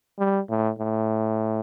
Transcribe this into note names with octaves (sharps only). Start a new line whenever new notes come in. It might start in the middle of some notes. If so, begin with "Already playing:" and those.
G3
A2
A2